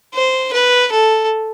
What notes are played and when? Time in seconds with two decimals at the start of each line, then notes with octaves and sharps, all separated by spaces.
0.14 C5
0.53 B4
0.92 A4